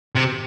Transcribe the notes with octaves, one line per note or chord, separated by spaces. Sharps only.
C3